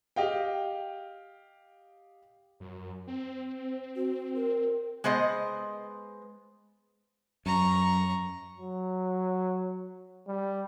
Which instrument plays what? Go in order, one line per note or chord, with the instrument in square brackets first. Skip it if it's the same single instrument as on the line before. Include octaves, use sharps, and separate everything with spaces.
[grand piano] G4 D#5 F5 G5
[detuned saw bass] F#2
C4
[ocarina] F#4
A#4
[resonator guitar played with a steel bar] G#3 B3 C5 D#5
[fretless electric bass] F#2 [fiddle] A#5 C#6
[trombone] F#3
G3